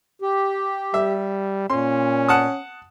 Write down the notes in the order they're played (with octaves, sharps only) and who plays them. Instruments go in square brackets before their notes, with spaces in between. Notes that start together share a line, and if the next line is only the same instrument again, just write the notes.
[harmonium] G4
[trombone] G3 [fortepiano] E5
[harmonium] A#2 [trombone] C#4 [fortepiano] C6
[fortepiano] F#5 A5 D#6